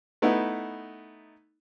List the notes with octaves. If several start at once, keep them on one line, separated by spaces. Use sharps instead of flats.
A3 B3 D#4 E4